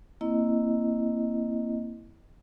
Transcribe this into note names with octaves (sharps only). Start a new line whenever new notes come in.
A#3 C4 E4 D#5